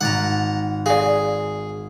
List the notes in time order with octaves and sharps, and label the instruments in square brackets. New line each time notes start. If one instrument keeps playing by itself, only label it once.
[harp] G#1 A6 [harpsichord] F#5 A#5
[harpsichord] G#4 [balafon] D5 F5